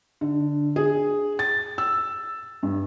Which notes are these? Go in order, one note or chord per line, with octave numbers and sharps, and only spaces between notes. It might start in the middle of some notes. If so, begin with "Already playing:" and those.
D3
G#4
A6
E6
G2